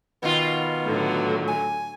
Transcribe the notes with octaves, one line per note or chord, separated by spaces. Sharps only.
B2 D#3 B3 F4
A2 D3 F#3
G#5